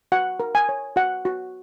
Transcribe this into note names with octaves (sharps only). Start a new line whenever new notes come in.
F#4 F#5
A#4
G#5
C#5
F#4 F#5
F#4